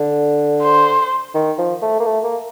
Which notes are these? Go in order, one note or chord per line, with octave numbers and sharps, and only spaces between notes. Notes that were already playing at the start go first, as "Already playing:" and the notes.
Already playing: D3
C5
D#3
F3
A3
A#3
A3
A#3